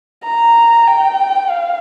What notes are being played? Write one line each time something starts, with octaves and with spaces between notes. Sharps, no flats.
A#5
G5
F5